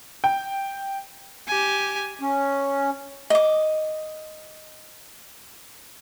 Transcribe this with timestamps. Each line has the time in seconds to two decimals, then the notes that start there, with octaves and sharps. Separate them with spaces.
0.24 G5
1.48 G4 G#5
2.20 C#4
3.30 D#5 D6